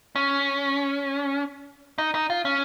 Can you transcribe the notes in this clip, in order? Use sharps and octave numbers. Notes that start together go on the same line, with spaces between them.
C#4
D#4
D#4
F4
C#4